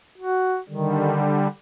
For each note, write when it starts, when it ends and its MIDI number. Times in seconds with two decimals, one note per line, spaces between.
0.18 0.58 66
0.69 1.48 50
0.69 1.26 51
0.69 1.48 55